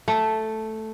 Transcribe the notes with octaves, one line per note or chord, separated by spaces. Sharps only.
A3